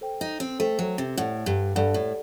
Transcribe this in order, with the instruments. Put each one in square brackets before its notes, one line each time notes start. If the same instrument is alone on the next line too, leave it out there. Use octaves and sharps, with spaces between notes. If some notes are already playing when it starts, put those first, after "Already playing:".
[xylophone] A4 C5 G5
[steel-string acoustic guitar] D#4
C4
[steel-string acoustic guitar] A3 [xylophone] A4 C5 G5
[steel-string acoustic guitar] F#3
C3
[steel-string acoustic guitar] A2 [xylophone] A4 D5 F#5
[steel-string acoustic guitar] G2
[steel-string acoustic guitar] G2 [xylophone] A4 D5 F#5
[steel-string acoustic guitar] A2